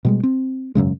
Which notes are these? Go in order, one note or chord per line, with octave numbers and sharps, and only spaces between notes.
B2 G3 G#3
C4
E1 F#2 C#3 G#3